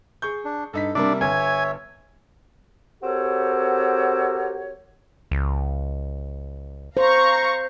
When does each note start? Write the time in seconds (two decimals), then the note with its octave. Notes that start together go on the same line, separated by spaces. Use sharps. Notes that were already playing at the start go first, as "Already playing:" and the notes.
0.22 G#4 C#6 G6
0.45 D4
0.73 G2 D#4 A4 B6
0.95 C3 G3 A#3 D4 E5
1.21 G1 C#5 E5 G#5
3.03 C4 F#4 G4 A4 A#4 C#5
5.31 C#2
6.97 C5 F5 A#5 C#6